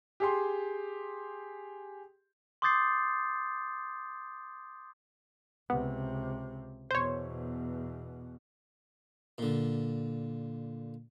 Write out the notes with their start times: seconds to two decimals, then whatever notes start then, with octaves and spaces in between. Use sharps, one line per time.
0.20 G4 G#4 C6
2.62 C6 D6 D#6 G6 A6 C7
5.70 C#2 C3 B3
6.91 E2 B2 C5 C#5
9.38 A#2 D3